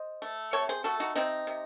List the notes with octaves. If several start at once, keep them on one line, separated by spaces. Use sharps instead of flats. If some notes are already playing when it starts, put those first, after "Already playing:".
Already playing: C5 D#5
A3
C3 A4 C#5
G#4 C5
A3 F#4 A4
D#4 F#4
C3 C4 D#4
C3